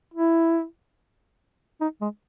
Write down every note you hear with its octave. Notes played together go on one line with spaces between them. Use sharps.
E4
D#4
G#3